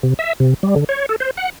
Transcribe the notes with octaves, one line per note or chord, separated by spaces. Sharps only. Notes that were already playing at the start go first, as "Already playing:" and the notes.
C3
E5
C3
G3
D3
C#5
A4
C5
F#5